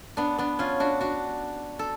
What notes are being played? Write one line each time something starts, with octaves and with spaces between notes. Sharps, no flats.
B3 D4
B3 D4
C#4 F4
D4 F#4
D4 F#4
A4